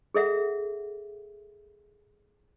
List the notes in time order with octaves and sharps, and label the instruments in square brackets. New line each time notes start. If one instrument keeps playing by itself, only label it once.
[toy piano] G#4 A4 E5 F#5